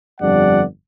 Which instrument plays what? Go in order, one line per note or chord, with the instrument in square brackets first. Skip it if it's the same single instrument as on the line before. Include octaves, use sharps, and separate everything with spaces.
[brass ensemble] G1 F2 G3 D4 D5 F#5